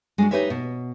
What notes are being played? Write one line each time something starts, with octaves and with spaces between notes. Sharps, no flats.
G#3 D4 F#4
D#4 F#4 G4 B4 C#5 E5
B2